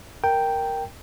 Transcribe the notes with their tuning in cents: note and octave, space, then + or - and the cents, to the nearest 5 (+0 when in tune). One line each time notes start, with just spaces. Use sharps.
A#4 +0 G5 +0 A#5 -25